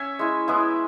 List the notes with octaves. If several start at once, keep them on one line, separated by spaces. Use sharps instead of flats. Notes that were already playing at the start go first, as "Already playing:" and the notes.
Already playing: C#4 C#5 E5 G#5
G#3 E4
G#3 B3 E4